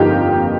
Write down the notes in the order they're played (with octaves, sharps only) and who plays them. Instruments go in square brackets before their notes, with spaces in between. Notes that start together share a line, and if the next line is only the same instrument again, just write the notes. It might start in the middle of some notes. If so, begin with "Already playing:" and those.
Already playing: [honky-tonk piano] G1 F2 A#3 D#4 F4 G4